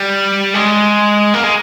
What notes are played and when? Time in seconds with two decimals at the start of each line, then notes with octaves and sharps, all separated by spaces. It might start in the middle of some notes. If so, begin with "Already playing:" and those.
Already playing: G3
0.54 G#3
1.34 A#3
1.44 G#3